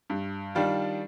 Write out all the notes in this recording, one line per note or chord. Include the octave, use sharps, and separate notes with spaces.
G2
D#3 G3 D4 F4